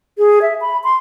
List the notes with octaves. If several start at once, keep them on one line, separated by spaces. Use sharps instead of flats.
G#4
E5
B5
C6